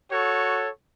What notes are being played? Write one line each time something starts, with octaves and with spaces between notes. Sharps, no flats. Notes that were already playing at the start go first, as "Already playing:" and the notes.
F#4 A4 C#5